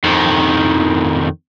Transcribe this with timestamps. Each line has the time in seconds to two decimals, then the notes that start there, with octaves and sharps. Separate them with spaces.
0.04 F2 D#3